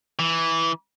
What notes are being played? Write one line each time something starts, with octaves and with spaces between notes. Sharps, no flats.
E3